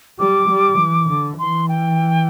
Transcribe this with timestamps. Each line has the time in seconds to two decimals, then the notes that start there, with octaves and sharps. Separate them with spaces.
0.19 G3 D6
0.49 G3
0.79 E3
1.09 D3
1.39 E3 C6
1.69 G5